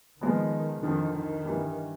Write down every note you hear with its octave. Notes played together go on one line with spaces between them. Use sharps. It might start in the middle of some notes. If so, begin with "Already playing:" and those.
D#3 F3 G#3 B3
F2 D3 D#3 F3
D#3
G2 E3 G3